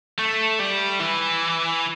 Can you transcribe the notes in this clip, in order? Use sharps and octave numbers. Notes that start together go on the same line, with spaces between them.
A3
G3
E3